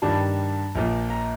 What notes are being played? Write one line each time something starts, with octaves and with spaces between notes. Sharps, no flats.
G2 D#3 G3 D4 A5
A#1 A#2 F3
A#5